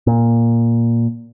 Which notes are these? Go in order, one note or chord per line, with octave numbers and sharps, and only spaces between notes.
A#2